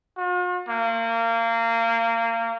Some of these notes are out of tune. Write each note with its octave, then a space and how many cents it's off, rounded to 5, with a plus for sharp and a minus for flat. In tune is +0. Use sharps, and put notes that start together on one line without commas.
F4 +45
A#3 -25